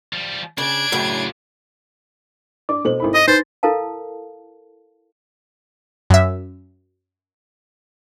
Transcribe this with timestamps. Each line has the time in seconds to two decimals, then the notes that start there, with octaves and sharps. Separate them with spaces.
0.13 F3 G3
0.58 C#3 D4 D5 G#6 D7
0.92 F#2 A2 C#3 D4 F4
2.69 D4 D5 D6
2.85 B2 A4 C5 F#7
3.00 G#1 E4 B5
3.14 D#5 D#6 A#6
3.28 D#4 B4 C5 C6 A6
3.63 E4 A4 A#4 F5 A5
6.10 F#2 E5